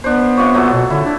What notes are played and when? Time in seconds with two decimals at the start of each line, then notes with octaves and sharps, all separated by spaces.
0.04 B3 D4 C5
0.37 C3 F4 C#5
0.54 A#2 F#3 A4
0.73 B2
0.90 D3 E4
1.05 D4